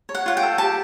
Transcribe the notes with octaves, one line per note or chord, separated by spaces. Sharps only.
C#5
F#5
F4 F#5
G5
A4
G4 A5